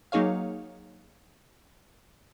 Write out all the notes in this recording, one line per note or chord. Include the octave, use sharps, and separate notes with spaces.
F#3 A#3 D#4 G#4 C#5 F5